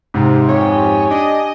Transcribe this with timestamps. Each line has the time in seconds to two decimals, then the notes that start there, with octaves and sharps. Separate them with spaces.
0.14 G#2 C3
0.49 F2 G4 C#5 G#5
1.10 D4 D#5